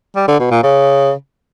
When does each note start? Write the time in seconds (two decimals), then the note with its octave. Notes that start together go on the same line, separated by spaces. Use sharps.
0.16 G3
0.28 D3
0.40 B2
0.51 A#2
0.63 C#3